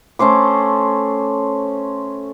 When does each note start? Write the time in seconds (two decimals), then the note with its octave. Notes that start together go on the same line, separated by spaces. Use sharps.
0.19 A3 C#4 C5 D6